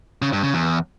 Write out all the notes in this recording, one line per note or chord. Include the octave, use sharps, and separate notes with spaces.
C#3
G2
C#3
E2